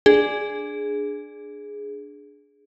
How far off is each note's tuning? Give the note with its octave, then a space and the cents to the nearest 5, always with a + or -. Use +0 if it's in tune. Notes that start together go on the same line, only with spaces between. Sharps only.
D4 +0 G#4 +0